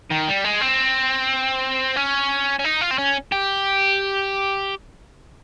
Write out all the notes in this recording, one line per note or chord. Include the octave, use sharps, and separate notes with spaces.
D#3
G3
G#3
C4
C#4
C#4
D#4
F4
C4
C#4
G4